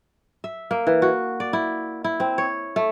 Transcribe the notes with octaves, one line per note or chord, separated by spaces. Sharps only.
E5
A#3
E3
F#4
D5
E4
E4
C4
C#5
A3